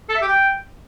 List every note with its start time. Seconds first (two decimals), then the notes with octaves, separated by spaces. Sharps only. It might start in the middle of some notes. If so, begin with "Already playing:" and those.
0.09 A4
0.15 E5
0.21 G4
0.28 G5